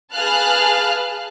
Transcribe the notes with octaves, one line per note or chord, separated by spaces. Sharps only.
G#4 B4 F5 A5 F6 F#6